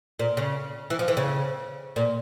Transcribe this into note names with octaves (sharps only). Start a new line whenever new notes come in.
A#2
C#3
E3
F3
E3
C#3
A#2